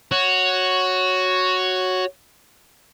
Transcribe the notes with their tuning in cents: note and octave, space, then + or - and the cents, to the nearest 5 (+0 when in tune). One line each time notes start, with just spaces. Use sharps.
F#4 +0 C#5 +0